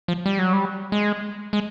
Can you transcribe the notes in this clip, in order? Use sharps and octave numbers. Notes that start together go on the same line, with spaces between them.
F3
G3
F#3
G3
G#3
G#3